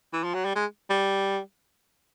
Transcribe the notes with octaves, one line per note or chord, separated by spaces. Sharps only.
E3
F3
F#3
G3
G#3
G3